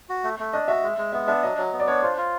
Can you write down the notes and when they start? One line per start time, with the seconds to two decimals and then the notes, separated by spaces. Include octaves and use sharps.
0.09 F#4
0.24 A3
0.39 A3
0.53 D4 D#5
0.68 F#4 E5
0.83 G#3
0.98 G#3
1.13 B3 E5
1.28 D4 E5
1.43 F#3 D#5
1.57 F#3
1.72 B3
1.80 D5
1.88 D4 C#5
2.02 F4 C5
2.17 F4